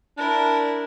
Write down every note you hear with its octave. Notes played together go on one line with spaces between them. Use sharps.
D4 E4 A#4